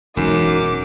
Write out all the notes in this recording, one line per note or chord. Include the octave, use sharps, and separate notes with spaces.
E1 F#2 E3 G#3 D#4 D6